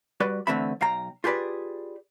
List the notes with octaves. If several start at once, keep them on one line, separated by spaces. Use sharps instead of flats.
G3 F#4 B4 D5
D3 E3 A3 C4 E5 B5
B1 F5 G5 A#5
F4 G4 G#4 B4 D5